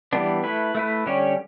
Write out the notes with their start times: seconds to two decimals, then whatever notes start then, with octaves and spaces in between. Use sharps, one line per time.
0.13 E3 G3 B3 D4
0.43 A3 E4 B4
0.75 A3 E4 B4
1.06 D3 G3 C#4 G4 C#5